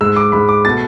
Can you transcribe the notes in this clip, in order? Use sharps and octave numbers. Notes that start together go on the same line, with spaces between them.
G#2 G#3 E6
D6
G#2 G#3 B5
D6
B2 A3 A6